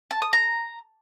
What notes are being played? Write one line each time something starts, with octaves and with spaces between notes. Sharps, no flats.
A5
D#6
A#5